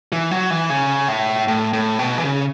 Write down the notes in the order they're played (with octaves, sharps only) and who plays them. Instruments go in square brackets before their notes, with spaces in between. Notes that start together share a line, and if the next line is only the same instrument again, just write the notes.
[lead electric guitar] E3
F#3
E3
C#3
A2
A2
A2
B2
E3
C#3